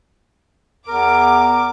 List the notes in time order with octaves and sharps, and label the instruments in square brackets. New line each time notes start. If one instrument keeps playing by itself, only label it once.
[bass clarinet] E2 [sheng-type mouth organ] A#4 [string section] D6